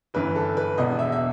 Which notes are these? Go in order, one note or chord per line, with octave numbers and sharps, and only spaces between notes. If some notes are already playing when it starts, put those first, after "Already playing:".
G1 F#2 E3 B4
A4
B4
E1 E2 B2 D#5
E5
E5